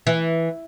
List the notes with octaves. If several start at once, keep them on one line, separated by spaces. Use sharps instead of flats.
E3